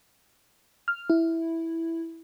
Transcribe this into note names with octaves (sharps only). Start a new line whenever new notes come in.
F6
E4